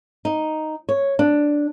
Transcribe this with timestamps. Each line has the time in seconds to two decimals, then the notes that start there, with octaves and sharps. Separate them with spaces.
0.25 D#4
0.89 C#5
1.19 D4